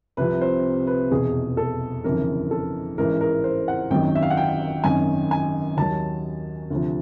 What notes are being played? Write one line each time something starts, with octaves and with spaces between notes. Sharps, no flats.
C2 C3 F3 B4
C5
B4
F1 E2 B2 G#4
A4
G1 F2 C#3 E3 A#4
A4
A1 G#2 E3 A#4
A#4
C5
F#5
G#1 F#2 D#3 F#3 G5
E5
F5
F#5
G5
G#1 F#2 D#3 G#5
G#5
D#2 D#3 F#3 A5
D2 C3 F3